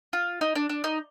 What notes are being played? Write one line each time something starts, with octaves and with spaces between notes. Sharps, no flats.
F4
D#4
D4
D4
D#4